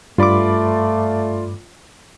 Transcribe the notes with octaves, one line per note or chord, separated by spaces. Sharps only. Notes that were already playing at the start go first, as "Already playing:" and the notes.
G2 A3 F4 D5 B5 D6